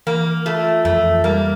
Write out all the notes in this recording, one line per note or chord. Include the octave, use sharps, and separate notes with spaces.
E3 A#3
A3 F4
F2 A3
G3 A#3